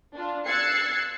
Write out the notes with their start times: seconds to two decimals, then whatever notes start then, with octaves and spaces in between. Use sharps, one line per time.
0.15 D4 F4
0.46 E6 F#6 G#6 A6 C7 C#7